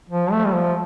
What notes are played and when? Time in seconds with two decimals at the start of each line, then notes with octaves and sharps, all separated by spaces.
0.09 F3
0.32 A3
0.47 G3
0.54 F3